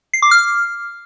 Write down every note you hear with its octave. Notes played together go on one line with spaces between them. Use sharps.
C7
D6
F6